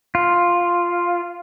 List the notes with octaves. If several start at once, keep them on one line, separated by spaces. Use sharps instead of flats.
F4